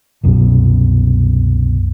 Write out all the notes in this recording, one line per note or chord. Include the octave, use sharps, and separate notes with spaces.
C2 F#2 B2